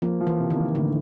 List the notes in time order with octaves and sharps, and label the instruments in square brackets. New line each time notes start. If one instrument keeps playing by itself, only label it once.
[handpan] F3 [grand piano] A#3
[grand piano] F3
[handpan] E3
[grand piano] C3
[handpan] D#3
[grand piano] A#3
[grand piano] A2 [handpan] D3